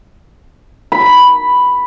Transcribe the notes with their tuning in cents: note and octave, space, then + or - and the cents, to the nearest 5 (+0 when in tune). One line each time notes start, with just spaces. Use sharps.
B5 +0